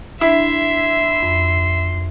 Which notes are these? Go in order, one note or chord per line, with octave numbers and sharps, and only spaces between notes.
D4 E4 E5 C6
F2